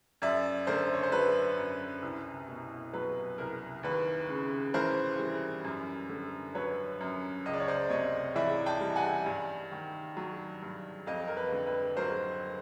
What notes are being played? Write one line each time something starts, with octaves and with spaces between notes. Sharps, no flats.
F#2 D5 E5
D3 A#4 C5
C#5
C5
F#3 B4
F#2
C2
B2
F#3 B4
C2 A#4
D#2 B4
C#3
E3 A#4 C5
G3
F#2
D3
F#3 B4 C#5
F#2
C#2 D#5
D5
C#5
C5 D5
C3 C#5 D#5
E3 D5 E5
G5 A5
G3
F#5 G#5
G2
D#3
F#3
G2
F2 D#5 F5
A#4
B4
D3
B4
F#3 A#4 C5